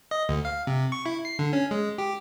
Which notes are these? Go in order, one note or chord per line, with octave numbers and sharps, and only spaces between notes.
D#5
D2
F5
C3
C#6
E4
C7
D3
C#4
G#3
G4